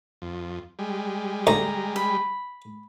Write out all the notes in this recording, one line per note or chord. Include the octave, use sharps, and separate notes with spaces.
F2
G3 G#3
D2 A#5
B5